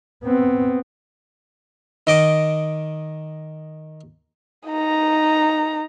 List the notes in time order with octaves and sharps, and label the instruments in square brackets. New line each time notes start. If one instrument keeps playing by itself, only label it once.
[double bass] B3 C4
[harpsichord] D#3 D#5 D6
[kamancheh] D#4 A#5